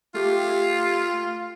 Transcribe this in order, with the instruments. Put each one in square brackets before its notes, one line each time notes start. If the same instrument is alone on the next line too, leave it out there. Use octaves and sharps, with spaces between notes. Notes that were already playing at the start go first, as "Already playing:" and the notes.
[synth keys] A3 G4 [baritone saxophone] F4